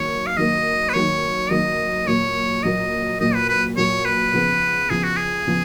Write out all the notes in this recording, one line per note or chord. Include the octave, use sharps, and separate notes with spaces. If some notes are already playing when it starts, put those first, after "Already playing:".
Already playing: D#3 F#3 A#3 C#5
F5
D#3 F#3 A#3 D#5
B4
D#3 F#3 A#3 C#5
D#3 F#3 A#3 D#5
A#2 F#3 A#3 C#5
A#2 F#3 A#3 D#5
A#2 F#3 A#3 D#5
B4
B4
A#2 F#3 A#3 C#5
B4
C#3 F3 B3
C#3 F3 B3 G#4
F#4
G#4
C#3 F3 B3